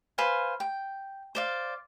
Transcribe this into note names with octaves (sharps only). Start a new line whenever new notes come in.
B4 C5 F5 G#5
G5
C5 D5 F5